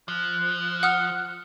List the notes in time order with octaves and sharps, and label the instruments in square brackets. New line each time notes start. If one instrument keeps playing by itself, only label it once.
[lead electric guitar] F3 [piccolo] F#6
[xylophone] F#5 D#6 F6